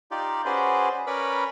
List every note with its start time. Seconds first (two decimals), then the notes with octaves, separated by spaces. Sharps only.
0.11 D#4 F4 G4 D5
0.45 C#4 F#4 G#4 B4 C5 D5
1.07 C#4 A#4 B4 C#5 D5 B5